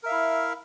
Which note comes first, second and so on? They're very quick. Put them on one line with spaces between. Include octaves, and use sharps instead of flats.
A#4 E5 F5 E4